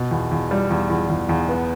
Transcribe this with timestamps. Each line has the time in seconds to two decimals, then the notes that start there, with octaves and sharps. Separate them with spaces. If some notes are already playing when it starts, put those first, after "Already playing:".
Already playing: B2
0.11 E2
0.31 E2
0.51 G3
0.70 E2
0.90 E2
1.10 E2
1.29 E2
1.49 B3